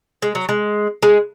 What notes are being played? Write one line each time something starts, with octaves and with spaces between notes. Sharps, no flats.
G#3
F#3
G#3
G#3